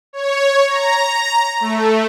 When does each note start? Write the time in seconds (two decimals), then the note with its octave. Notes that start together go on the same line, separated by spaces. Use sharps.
0.13 C#5
0.67 A#5
1.61 A3